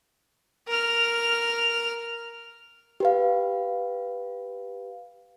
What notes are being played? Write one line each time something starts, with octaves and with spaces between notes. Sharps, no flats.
A#4 F6
G4 B4 F5